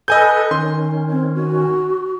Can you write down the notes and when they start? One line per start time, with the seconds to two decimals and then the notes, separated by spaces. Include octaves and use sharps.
0.08 A4 B4 D#5 G#5 G6
0.51 D#3 C#4 C6
1.10 C4
1.35 F#4